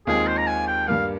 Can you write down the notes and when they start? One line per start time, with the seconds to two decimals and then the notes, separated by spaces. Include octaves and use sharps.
0.07 D#2 D#3 G#3 C4 F4 G#4
0.27 C5
0.37 A#5
0.47 G#5
0.68 G5
0.88 G2 G3 A#3 F5